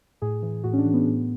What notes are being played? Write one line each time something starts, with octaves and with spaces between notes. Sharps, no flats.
A2 G#4
E3
A2 F#4
C#4
D4
E3
B3
A2